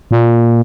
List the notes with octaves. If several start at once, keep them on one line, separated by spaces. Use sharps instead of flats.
A#2